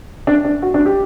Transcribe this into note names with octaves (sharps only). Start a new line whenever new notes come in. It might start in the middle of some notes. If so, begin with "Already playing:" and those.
D4
D4
F#4
D4
G4